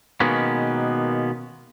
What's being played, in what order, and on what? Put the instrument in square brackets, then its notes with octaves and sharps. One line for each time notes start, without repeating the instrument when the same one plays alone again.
[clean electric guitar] B2 D#3 G#3 A#3 B3 C#4